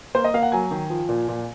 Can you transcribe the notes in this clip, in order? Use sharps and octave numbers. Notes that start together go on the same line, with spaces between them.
A#3 C5
D#5
A#3 F5
F#5
F#3 G#5
D#3
F3
A#2
A#2